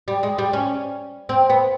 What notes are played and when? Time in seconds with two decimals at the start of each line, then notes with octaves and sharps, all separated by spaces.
0.08 G3
0.23 G#3
0.38 G3
0.53 C#4
1.29 C4
1.50 B3